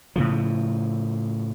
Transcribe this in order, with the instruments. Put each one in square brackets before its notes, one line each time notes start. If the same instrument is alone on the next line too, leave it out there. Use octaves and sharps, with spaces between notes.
[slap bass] A2 C#3 F3